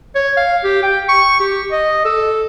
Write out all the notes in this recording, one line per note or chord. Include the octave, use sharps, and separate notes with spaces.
C#5
F5
G4
G5
C#6
G4
D#5
A4